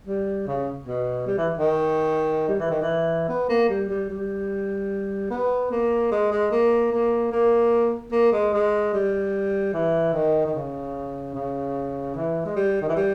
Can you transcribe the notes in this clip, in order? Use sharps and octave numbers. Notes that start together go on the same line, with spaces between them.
G3
C#3
B2
G3
E3
D#3
G3
E3
D#3
E3
B3
A#3
G3
G3
G3
B3
A#3
G#3
G#3
A#3
A#3
A#3
A#3
G#3
G#3
G3
E3
D#3
D#3
C#3
C#3
E3
G#3
G3
D#3
E3
G3